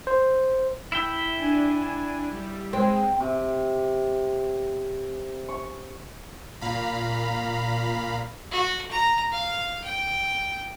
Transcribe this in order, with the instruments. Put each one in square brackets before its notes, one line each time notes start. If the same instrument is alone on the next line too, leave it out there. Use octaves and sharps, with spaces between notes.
[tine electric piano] C5
[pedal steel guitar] E4 E5 G5
[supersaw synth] D4 G#5
G3
[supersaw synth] G#3 [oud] C4
[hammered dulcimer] C3
C#6
[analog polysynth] A#2 F5 A#5 B5
[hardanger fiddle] F#4
A#5
F5
G5